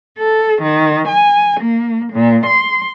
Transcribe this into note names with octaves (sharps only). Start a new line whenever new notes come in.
A4
D#3
G#5
A#3
A#2
C6